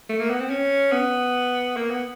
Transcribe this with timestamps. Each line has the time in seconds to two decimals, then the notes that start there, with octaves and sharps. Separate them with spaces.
0.09 A3
0.19 A#3
0.30 B3
0.40 C4
0.50 C#4
0.92 B3
1.77 A#3
1.91 B3